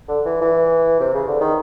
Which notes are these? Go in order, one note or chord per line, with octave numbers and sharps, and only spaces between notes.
D3
E3
E3
C3
C#3
D3
D#3